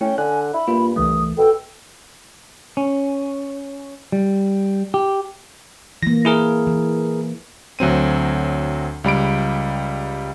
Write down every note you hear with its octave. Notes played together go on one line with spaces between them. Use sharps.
A3 C#4 E4 G5
D3 G#5 F#6
E4 B5
G2 A#3 F4
C2 E3 A3 D#6
B2 A4 G5
C#4
G3
G4
E3 A#3 A#6
E4 G#4 A#4
E3
D2 F#3 C4 D#7
C#2 G3 B5 D7